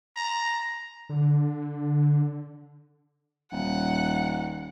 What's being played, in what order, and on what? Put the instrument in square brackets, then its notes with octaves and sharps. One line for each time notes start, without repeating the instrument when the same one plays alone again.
[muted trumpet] A#5
[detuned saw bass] D3
[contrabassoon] D#1 [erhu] F#5